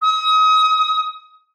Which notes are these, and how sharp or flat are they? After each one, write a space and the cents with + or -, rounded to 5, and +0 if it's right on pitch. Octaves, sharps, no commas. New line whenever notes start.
D#6 +35